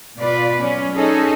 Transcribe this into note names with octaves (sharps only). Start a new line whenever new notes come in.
B2 F4 B4 D5
F#3 C#4
C#4 D#4 G#4 A4